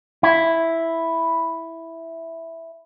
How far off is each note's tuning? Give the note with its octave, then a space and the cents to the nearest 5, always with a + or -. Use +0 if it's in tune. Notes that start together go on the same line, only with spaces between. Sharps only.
E4 +0